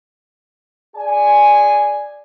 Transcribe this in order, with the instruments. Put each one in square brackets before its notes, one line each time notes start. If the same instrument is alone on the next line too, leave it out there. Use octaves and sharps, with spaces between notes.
[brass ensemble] G#4 D5 G#5